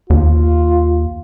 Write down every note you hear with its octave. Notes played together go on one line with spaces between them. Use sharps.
D#2 F4